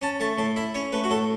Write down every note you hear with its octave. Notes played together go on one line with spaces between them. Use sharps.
C#4 A5
A3 A5
A2 A5
E4 E5
C#4 C#5
A3 B4
F#4
A2 A4